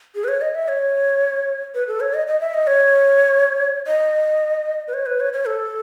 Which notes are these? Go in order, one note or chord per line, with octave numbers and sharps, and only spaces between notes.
G#4
B4
C#5
D#5
E5
C#5
B4
A4
C#5
D#5
D#5
E5
D#5
C#5
D#5
B4
C#5
B4
C#5
C#5
A4